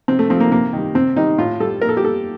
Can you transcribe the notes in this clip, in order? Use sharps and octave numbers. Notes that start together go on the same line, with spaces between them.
C3 C4
A3
F3 C4
A#3
C3 A#3
D#3 G3
C3 C4
D#3 G3 D#4
A2 F4
G3 A4
A#2 A#4
A4
G4
G3 A4